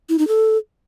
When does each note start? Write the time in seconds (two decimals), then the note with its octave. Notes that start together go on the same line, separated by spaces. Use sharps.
0.09 E4
0.19 D#4
0.28 A4